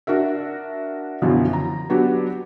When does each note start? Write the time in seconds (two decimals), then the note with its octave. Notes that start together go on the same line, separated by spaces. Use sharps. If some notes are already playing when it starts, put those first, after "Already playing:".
0.07 D4 F#4 A#4 E5
1.22 F#2 B2 D3 E3 F3
1.53 A#5
1.90 F#3 B3 D4 F#4 G4